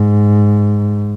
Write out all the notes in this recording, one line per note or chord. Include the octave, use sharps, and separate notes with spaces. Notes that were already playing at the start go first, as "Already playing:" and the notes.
Already playing: G#2